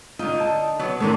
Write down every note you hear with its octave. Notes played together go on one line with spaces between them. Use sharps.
D3 D#4 F4
A5
F#3 B3
C3 D#3 E3 A3 D4